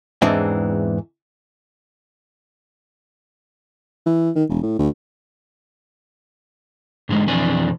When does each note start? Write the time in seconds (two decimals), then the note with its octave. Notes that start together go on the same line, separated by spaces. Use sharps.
0.22 E2 G#2 E3 C4 D4
4.06 E3
4.35 D#3
4.50 E1
4.63 A2
4.79 D2
7.09 G#2 D3 G#3
7.27 B1 F2 E3 C4 D4 G#5